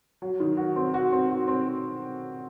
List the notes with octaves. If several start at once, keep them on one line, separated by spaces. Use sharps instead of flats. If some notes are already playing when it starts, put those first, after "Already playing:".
F#3
D#3
F#4
C4
F#4
C4
F#4
C4